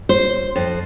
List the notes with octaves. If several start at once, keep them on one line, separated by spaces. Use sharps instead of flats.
C5
F2